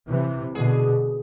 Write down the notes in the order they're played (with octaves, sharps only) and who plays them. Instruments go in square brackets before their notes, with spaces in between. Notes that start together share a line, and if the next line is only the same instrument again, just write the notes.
[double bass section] C3 E3
[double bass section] B2 D3 [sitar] G#4